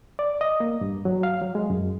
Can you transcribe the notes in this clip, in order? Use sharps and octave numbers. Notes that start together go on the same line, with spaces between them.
D5
D#5
A#3
G2
F#3
F5
F#3
G#3
F#2